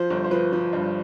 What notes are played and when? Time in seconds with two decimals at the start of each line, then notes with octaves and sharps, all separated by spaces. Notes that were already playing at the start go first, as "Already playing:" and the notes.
Already playing: F3 C5
0.10 G1
0.24 C5
0.31 F3 B4
0.53 F3
0.73 G2